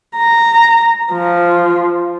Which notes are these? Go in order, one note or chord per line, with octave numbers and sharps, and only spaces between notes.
A#5
F3